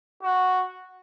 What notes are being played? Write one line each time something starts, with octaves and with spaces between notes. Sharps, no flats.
F#4